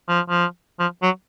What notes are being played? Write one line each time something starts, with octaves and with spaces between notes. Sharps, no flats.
F3
F3
F3
F#3